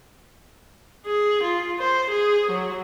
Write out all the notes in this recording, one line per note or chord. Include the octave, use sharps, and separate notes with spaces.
G#4
F4
C5
G#4
F#3